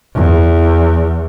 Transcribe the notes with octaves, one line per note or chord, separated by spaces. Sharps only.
E2